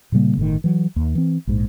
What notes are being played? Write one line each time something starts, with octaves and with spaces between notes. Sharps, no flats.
A#2 C#3 G3 A#3
G1 A2 D#3
E3 F#3
D#2
E3 C4
A#1 G#2